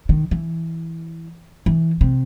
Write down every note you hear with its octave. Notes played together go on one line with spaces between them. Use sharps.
D#3
E3
E3
C3